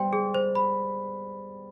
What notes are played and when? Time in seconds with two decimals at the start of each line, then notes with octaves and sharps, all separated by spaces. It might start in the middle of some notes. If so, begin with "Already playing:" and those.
Already playing: G3 B3 C5 G5 C6
0.13 G#4
0.34 C5
0.55 B5